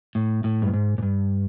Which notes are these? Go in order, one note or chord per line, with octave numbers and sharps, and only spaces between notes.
A2
A2
G2
G#2
G#2
G2